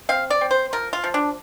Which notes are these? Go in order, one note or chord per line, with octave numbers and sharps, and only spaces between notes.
C4 F5
D5
C4
C5
F3 A#4
F4
F3
D4